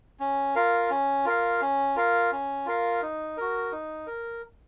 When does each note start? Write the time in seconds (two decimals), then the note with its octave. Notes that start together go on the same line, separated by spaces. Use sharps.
0.20 C#4
0.55 F4 A#4 F5
0.90 C#4
1.25 F4 A#4 F5
1.61 C#4
1.96 F4 A#4 F5
2.32 C#4
2.66 F4 A#4 F5
3.02 D#4
3.37 F#4 A#4
3.72 D#4
4.07 A#4